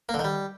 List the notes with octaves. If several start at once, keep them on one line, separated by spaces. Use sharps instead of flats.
A#3
D3
D#3
G3